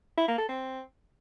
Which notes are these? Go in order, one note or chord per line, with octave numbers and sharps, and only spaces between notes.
E4
A#3
A4
C4